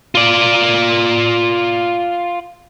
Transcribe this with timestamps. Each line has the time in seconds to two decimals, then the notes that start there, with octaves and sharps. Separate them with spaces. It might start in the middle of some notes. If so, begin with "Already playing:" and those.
0.15 F4 D5